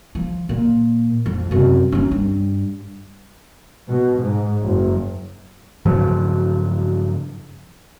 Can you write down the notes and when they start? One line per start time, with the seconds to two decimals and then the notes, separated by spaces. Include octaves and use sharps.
0.15 F3
0.49 A#2
1.26 F2
1.51 F#2 C3
1.92 F#2 C#4
2.11 G2
3.89 B2
4.21 G#2
4.62 F#1
5.85 G2 C#3 F3 F#3